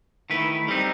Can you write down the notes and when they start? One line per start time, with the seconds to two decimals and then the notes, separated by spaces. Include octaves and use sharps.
0.30 D#3 A3 E4 B4
0.68 G3 C4 D#4